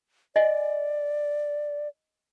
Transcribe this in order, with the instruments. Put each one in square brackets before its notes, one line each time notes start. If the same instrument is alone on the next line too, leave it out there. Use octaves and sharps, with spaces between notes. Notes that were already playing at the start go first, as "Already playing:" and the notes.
[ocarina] D5 [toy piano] D#5 G#5